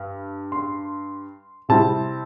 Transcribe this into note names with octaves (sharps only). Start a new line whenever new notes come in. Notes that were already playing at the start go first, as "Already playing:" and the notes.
Already playing: G2
C6
C3 G3 C4 E4 A5